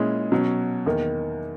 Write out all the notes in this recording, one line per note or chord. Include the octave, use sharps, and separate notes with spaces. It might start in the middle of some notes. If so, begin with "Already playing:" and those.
Already playing: A#2 G#3 C#4 E4 G#4
B2 F#3 C#4
E2 D#3 A#3